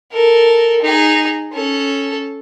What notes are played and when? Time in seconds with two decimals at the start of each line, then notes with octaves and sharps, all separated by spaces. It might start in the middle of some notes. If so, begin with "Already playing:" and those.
0.12 A4 A#4
0.82 D#4 G#4
1.52 C#4 A4